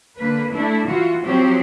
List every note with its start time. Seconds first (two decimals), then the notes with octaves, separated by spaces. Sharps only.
0.17 D3 A#3 B4
0.50 A3 D4 E4
0.86 E3 F4 F#4
1.22 F3 F#3 C4 G4 C5